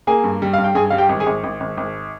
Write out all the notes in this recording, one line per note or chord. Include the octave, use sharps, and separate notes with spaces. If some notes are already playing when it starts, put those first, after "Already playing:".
A#3 G#4 G#5
G2
G3
G2 F5
G5
G2 G#4 G#5
G3 F5
G4 G5
G#1
G#4 G#5
G#1
G#1
G#1
G#1